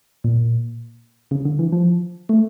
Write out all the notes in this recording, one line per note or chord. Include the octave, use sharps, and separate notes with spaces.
A#2
C#3
D3
E3
F3
A3